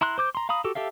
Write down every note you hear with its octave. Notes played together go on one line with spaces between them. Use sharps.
E4 A#5 C6 F#6
C5 D6 G6
A#5 C6
F5 A#5 B5 D#6
F#4 G4 A4
G4 A4 E5 F5